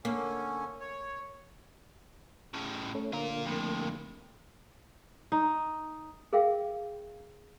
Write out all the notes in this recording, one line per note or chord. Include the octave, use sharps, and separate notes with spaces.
D3 A#3 C#4
C#5
A2 C#3
A3 C#4
D3 A#3 F4 A#4
F2 A2
D#4
G#4 A#4 E5 F5 G5